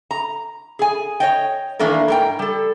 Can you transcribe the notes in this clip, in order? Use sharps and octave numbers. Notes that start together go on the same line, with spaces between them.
A#5
G#4 G#5
C#5 D#5 G5
D#3 E3 A3 A#3 D4 A#4
G#2 A#4 G5
G3 A4